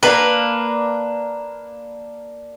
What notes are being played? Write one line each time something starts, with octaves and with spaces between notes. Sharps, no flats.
A#3 D4 A#4 B4